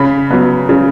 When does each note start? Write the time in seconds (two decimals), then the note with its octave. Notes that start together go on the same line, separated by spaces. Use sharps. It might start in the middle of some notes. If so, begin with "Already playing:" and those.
Already playing: C#3 B5
0.31 F#3 B3
0.69 C#3